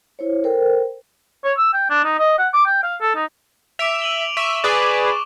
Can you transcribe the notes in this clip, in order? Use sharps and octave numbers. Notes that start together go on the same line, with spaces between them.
E4 C5 C#5
A4 A#4 C5 G5
C#5
E6
G5
D4
D#4
D#5
F#5
D6
G5
F5
A4
D#4
E5 D6 D7 F7
D#7 F#7 G7
E5 C#6 E7
G#4 B4 D5 D6